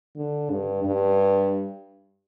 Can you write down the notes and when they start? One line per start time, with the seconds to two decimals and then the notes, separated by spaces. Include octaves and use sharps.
0.16 D3
0.51 G2
0.84 G2